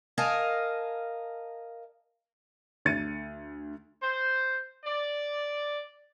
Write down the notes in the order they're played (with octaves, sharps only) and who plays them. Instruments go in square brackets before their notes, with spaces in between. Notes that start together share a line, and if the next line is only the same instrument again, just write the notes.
[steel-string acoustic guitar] A#4 D#5 F5 G#5 A5
[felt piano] D2 A6 C#7 D#7
[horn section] C5
D5